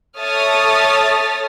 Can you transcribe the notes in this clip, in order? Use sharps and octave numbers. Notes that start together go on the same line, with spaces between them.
A4 C#5 E5 D#6 F6 A6